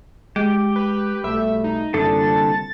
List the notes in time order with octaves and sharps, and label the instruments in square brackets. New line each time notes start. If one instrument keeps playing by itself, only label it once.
[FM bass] G#3 [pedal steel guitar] G4
[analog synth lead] B4
[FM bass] B1 [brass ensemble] B2 G3 A3 [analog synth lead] E5
[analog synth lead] D#4
[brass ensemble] C2 A#2 A5 [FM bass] F#2 [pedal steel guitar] D3 A4 D#6 [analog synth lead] A6